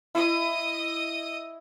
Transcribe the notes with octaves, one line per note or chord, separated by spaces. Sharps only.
E4 D#5 D#6